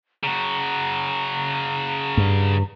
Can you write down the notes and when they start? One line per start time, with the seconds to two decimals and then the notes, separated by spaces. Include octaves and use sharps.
0.24 C#3 F#4 A#5
2.17 G2